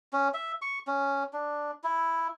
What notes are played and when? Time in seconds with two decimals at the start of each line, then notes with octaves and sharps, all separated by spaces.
0.13 C#4
0.34 E5
0.62 C#6
0.87 C#4
1.33 D4
1.84 E4